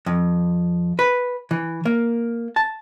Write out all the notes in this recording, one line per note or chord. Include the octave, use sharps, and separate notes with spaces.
F2
B4
E3
A#3
A5